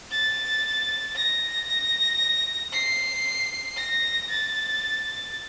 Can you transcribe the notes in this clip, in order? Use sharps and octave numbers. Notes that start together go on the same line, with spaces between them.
A6
A#6
C7
A#6
A6